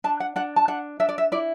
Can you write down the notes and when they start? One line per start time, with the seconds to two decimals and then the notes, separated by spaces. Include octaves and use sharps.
0.04 D4 A5
0.20 F#5
0.36 D4 F#5
0.56 A5
0.68 D4 F#5
1.00 D4 E5
1.09 D5
1.18 E5
1.32 E4 D5